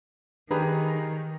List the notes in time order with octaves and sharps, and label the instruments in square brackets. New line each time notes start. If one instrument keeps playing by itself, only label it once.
[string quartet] D#3 [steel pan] D4 B4 [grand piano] G4 G#4 A#5